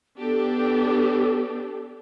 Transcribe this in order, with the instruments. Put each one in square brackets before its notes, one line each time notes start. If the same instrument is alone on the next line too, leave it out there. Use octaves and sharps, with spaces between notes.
[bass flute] B3 [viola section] D4 G4 A4